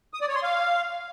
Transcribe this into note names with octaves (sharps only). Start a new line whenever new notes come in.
D#6
D5
C#5
C6
F5